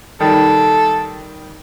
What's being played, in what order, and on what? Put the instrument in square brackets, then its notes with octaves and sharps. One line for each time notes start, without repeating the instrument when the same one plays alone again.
[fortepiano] D#3 G3 [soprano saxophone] A4